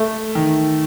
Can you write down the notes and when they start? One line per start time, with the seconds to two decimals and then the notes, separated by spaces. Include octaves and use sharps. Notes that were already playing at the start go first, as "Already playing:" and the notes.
Already playing: A3
0.35 D#3